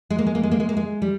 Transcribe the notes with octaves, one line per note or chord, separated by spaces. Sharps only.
G#3
A#3
G#3
A#3
G#3
A#3
G#3
A#3
G#3
G3